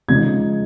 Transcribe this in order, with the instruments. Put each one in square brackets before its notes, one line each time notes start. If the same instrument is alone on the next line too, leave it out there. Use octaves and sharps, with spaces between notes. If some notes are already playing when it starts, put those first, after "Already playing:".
[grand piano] C#3 F3 G#3 D#4 G#6